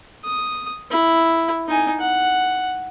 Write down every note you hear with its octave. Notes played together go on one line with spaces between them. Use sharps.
D#6
E4
D#4 G#5
F#5